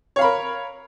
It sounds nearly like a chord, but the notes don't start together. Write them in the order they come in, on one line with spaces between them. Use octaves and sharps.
C#5 F5 B5 A#4